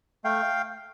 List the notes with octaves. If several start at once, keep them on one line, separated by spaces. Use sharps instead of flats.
A3 F5 G5